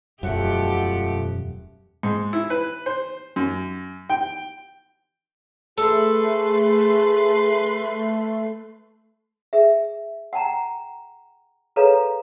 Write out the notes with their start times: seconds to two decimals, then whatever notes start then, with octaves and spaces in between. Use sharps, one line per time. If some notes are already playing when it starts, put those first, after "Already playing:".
0.23 E1 F#2 B2 F3 A3 G4 F#5
2.03 G#2
2.33 E4
2.50 B4
2.86 C5
3.36 F#2
4.10 G5
5.78 A3 G#4 A4 B4 C6
9.53 G#4 E5
10.33 F#5 G5 A5 A#5
11.76 G#4 A4 B4 C#5 F5 A#5